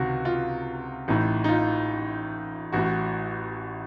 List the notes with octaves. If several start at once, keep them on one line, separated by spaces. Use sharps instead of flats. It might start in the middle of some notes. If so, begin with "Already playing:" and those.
Already playing: C#2 C3 D#3 F#4
F4
A1 A2 D#4
D#4
F4
A1 A2 F#4